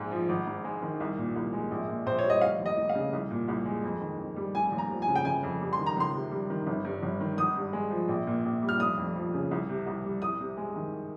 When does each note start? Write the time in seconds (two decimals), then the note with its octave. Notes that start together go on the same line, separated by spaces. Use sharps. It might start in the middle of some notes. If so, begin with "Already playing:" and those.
Already playing: A#1 G#2 G#3
0.11 F3
0.29 G#1
0.47 G#2
0.64 G#3
0.82 D#3
1.00 C2
1.18 A#2
1.36 C2
1.53 G#3
1.71 A#1
1.88 A#2
2.06 A#1 C5
2.19 C#5
2.24 G3
2.30 D#5
2.41 F1 F5
2.59 D#2
2.66 D#5
2.77 F1
2.89 F5
2.95 C#3
3.13 C2
3.31 A#2
3.48 C2
3.66 G#3
3.84 F2
4.01 D#3
4.19 F2
4.36 G3
4.55 F1 G#5
4.72 D#2
4.78 A#5
4.90 F3
5.02 G#5
5.08 C#3
5.15 G5
5.25 G1 G#5
5.43 F2
5.61 G3
5.73 C6
5.79 D#3
5.86 A#5
5.97 C#2 C6
6.14 C3
6.31 G3
6.50 D#3
6.67 G1
6.85 G2
7.03 G1
7.20 D#3
7.38 G#1 D#6
7.56 G2
7.73 G#3
7.91 F3
8.09 A#1
8.27 A#2
8.45 A#1
8.62 G3
8.69 F6
8.80 F1 D#6
8.98 F2
9.15 F3
9.34 C#3
9.51 C2
9.69 C3
9.86 C2
10.05 G3
10.22 C2 D#6
10.40 C3
10.57 G#3
10.76 D#3